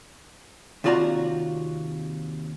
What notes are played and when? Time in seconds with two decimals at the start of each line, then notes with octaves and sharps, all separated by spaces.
0.84 D#2 C3 F4 F#4 D5 A#5